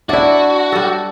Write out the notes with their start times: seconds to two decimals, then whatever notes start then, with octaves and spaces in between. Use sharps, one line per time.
0.09 D4 E4 F#4 D5 E5
0.72 G3 A4